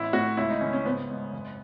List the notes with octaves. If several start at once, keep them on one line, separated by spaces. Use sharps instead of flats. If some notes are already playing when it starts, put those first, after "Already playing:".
Already playing: A1 E4
A2 F#4
C#2 E4
D#4
C#3 C#4
C#4
G#1 B3
G#2
F#1